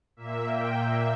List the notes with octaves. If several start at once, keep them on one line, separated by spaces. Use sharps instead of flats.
A#2 A#3 E5
G5
E5